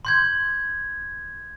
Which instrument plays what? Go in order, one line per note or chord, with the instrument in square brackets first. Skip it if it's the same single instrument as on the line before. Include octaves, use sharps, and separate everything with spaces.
[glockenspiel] C6 G6 G#6